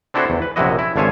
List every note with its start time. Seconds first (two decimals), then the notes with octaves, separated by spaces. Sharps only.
0.14 C4 D4 E4 F#4 A4 C5
0.30 E2
0.42 B4
0.56 A#1 F#2 C3 E4 F#4 D#5
0.79 E4
0.96 G#1 D3 F4 C#5 E5 G#5